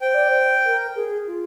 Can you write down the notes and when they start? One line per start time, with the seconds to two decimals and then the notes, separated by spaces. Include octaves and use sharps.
0.01 C5 G5
0.14 D5
0.29 C5
0.65 A#4
0.95 G#4
1.27 F4